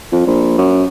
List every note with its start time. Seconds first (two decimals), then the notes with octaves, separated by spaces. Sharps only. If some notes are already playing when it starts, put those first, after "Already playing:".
0.12 F2
0.27 A#1
0.58 F#2